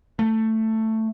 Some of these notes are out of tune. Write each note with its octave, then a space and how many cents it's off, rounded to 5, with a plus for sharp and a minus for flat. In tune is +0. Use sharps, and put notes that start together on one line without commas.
A3 +10